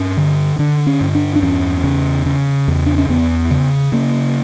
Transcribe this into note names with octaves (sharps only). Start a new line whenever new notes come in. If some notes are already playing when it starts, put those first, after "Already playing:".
Already playing: G2 C#4
D3
D3 D4
C#4
G2
D4
D4
E2 C#4
C#3
C#3
E2
D4
C#4
E2 B3
C#3
C#3 A#3